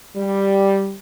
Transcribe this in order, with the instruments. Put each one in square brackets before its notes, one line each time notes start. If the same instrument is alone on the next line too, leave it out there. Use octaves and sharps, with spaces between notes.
[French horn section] G3